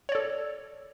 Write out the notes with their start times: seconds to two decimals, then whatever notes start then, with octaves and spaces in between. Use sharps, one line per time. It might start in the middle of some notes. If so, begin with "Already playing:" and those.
0.09 C#5
0.12 D5
0.15 A4